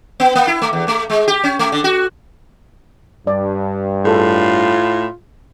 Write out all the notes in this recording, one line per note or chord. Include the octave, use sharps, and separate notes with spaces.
B3
A#3
E4
A3
E2
A3
G#3
G4
C#4
A3
D3
F#4
G2 D5
A2 F4 G#4 A4